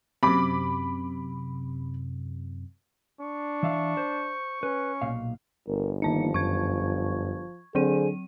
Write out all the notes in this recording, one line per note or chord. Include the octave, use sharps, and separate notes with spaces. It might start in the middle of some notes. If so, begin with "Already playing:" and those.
F#2 C3 B5 D6
D4 C#6
E3 E5 F5
C5
C#4 B4
B1 A#2 F5
G1 A#4
D#3 F3 A#3 D#4 A5 C#7
F#2 C#6 G#6
D3 F#3 C4 G#4 C5 D#7